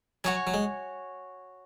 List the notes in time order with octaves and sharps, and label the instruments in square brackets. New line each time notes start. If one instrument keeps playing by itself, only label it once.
[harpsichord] F#3 [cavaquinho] F#4 C#5 G#5
[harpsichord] F#3
G#3